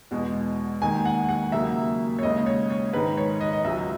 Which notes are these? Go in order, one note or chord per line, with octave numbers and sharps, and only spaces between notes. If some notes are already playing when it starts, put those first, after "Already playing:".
E2 B2 G#3
D#2 D#3 G#3 G#5
F#5
F#5
D#2 C#3 F#3 A#3 E5
C#5
D#2 C#3 G#3 D#5
C#5
C#5
G#2 D#3 G#3 B4
C#5
D#5
D#5
C#2 C#3 F#3 E5